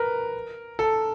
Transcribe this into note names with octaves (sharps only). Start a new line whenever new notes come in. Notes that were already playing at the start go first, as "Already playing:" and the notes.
Already playing: A#4 B4
A4